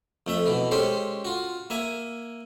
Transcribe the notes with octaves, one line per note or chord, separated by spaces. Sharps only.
F2 A3 E5
B2 E3
G#3 C#4 G4 A4 C5
F4 F#4
A#3 E5 G#5